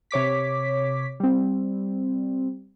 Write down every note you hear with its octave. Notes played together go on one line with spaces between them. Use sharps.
C3 C#5 D6 B6
G3 C4